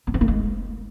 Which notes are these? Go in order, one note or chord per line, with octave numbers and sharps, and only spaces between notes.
B3
C4
A#3
G#3